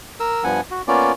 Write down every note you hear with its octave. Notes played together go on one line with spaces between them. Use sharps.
A#4 E6
G2 F3 B3 F#5 G#5
F#4
A#3 B3 C#4 F4 D5